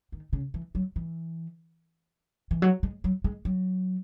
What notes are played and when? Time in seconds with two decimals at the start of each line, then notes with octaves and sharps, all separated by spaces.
0.12 D#3
0.33 C#3
0.54 E3
0.75 F#3
0.96 E3
2.51 E3
2.62 F#3
2.83 G#3
3.04 F#3
3.24 G#3
3.45 F#3